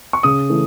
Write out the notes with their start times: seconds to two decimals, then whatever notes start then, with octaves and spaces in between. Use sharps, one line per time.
0.13 C#6
0.23 C#3 D#6
0.50 E3 A3